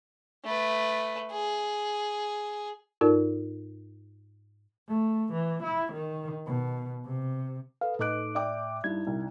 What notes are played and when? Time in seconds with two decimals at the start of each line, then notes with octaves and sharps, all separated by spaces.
0.45 A3 B4
1.32 G#4
3.01 G#2 D#4 F4 A4 A#4 D5
4.88 A3
5.33 E3
5.63 E4
5.93 D#3
6.46 B2
7.06 C3
7.81 A4 B4 F5
7.99 A2 D#4 A4 D#5 D6 F#6 D7
8.35 D5 E5 G5 D6
8.84 G2 D#4 E4 G#6
9.07 C2